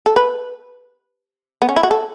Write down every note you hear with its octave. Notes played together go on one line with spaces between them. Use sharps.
A4
B4
B3
C#4
E4
F#4
A4